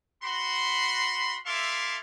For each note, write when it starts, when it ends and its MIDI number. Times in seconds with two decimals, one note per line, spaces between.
0.23 1.38 66
0.23 1.38 83
0.23 1.38 84
1.46 1.99 64
1.46 1.99 69
1.46 1.99 76
1.46 1.99 77
1.46 1.99 84
1.46 1.99 86